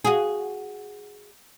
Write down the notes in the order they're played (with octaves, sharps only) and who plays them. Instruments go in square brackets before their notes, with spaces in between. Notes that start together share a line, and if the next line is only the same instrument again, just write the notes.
[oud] F#4 G#4